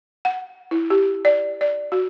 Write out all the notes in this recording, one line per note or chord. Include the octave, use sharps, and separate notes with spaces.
F#5
E4
G4
D5
D5
F#4